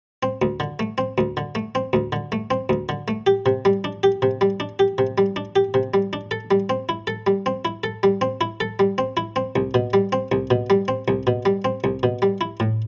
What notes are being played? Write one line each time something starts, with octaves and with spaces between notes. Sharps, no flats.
C4
D2
D3
A3
C4
D2
D3
A3
C4
D2
D3
A3
C4
D2
D3
A3
G4
C3
G3
D4
G4
C3
G3
D4
G4
C3
G3
D4
G4
C3
G3
D4
A4
G3
C4
E4
A4
G3
C4
E4
A4
G3
C4
E4
A4
G3
C4
E4
C4
C2
B2
G3
C4
C2
B2
G3
C4
C2
B2
G3
C4
C2
B2
G3
E4
A2